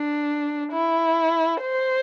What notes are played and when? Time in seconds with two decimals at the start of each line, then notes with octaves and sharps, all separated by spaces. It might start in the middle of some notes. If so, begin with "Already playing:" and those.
Already playing: D4
0.73 E4
1.62 C5